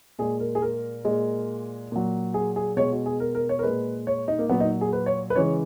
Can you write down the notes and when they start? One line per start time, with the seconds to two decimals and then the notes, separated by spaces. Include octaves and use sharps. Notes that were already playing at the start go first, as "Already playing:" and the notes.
0.19 A#2 G#3 G#4
0.40 A#4
0.55 G#4
0.62 A#4
1.05 A#2 G#3
1.92 A#2 F#3
2.34 G#4
2.56 G#4
2.77 B2 G#3 C#5
2.92 F#4
3.06 G#4
3.20 A#4
3.35 A#4
3.49 C#5
3.59 A#4
3.63 A#2 G#3 B4
4.07 C#5
4.28 D#4
4.38 A#3
4.49 A#2 F#3 B3
4.60 D#4
4.81 G#4
4.93 B4
5.06 C#5
5.30 B4
5.35 C#3 E3 G#3 C#5